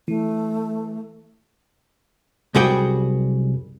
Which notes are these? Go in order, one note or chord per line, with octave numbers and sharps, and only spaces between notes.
E3 A3
C2 F#2 G3 F#4 G#4 G5